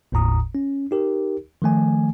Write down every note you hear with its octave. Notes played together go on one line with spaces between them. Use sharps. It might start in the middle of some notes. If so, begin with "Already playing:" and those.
G1 D#2 A2 A#5 D#6
C#4
D#4 G4 A#4
D#3 F3 A3 G#5